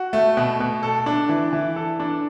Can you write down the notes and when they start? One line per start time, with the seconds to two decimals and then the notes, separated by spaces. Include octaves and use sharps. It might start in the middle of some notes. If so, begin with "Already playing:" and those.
Already playing: F#4
0.13 A3
0.37 B2
0.60 B2
0.83 A4
1.06 D4
1.29 E3
1.53 E3
1.76 A4
2.00 D4